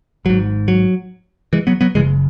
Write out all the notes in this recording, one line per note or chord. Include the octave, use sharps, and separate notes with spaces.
G#1 G#2 F#3
F#3
E3 G#3
F#3 B3
F#3 B3
F#1 F#2 C#3 E3 G#3